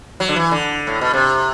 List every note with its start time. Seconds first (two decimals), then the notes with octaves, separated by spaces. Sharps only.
0.20 F#3
0.29 D3
0.36 E3
0.51 D3
0.87 A2
1.01 B2
1.14 C3